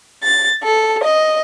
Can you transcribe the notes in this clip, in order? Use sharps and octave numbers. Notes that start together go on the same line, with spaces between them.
A6
A4
D#5